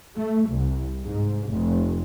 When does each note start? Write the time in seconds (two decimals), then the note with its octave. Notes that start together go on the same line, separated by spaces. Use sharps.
0.17 A3
0.49 C2
1.05 G#2
1.49 F1